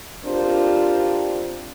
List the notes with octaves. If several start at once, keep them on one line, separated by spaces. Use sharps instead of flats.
C4 D4 F4 G4 A#4 C5